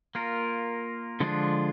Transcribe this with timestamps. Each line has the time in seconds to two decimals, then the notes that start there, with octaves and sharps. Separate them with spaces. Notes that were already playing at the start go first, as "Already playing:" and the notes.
0.15 A#3 F4 A#4
1.20 D3 F3 G#3 D4 F4